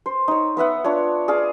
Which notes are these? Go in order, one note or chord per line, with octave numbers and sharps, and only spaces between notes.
C5
D#4 C#5
B3 B4 E5 F#5
D4 F4 C#5
G#4 D5 F5